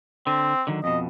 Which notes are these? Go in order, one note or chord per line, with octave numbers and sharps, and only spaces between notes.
D3 C4
D3 D#3 F#3
F2 B2 D#5